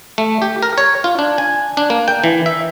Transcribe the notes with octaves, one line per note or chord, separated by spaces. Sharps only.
A3
G4
A#4
C#5
F4
D4
G#5
D4
A#3
G5
E3
E5